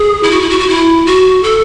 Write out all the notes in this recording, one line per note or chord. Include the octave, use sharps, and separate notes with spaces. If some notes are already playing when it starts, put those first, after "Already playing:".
Already playing: G#4
E4
F#4
E4
F#4
F#4
E4
F#4
A4